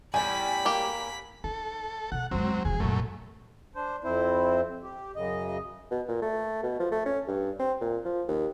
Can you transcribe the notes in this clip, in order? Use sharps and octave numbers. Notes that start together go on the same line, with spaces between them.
E2 A2 G3 G#5 B5 B6
A#3 G4
D#4 A4
B2 F#5
F2 F#3 G#3 C4
E1 E2 G#4
A#1 F#2 A#2 A3
D4 C5
F2 C4 E4 C5
G4
F#2 C#3 D#5
B2
A#2
A3
B2
F3
A3
C#4
G2
C4
A#2
F3
D#2